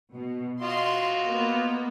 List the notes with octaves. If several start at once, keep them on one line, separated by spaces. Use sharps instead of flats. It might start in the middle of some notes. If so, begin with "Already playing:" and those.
B2
F4 F#4 D#5 C6
A#3 B3